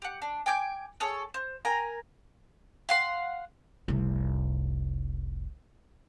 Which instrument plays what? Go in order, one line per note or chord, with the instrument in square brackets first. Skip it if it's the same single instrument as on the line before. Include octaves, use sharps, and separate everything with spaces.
[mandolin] G4 F#5
D4
G5 G#5 D6 G6
G#4 A4 C#5
C5
A#4 G5 G#5 A#5
F5 F#5 C6
[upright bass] F1 C2